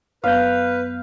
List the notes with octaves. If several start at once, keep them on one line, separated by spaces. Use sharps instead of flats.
F#2 B3 B4 F5 G6